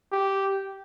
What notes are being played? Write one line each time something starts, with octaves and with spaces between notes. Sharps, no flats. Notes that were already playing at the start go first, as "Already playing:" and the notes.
G4